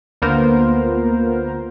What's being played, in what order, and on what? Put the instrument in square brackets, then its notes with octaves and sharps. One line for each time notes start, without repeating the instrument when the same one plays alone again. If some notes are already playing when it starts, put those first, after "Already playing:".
[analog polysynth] D2 A#3 B3 F4 A#4 C5